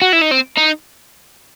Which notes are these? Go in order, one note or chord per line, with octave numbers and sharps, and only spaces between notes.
F#4
E4
D#4
C4
D#4